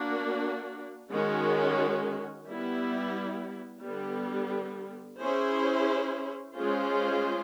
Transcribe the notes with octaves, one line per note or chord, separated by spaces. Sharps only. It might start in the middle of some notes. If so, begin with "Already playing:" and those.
Already playing: A#3 D4 F#4
D#3 G#3 C#4 F#4
G3 B3 E4
D3 G3 B3
C#4 E4 G#4 C5
G#3 C#4 F4 G#4 C5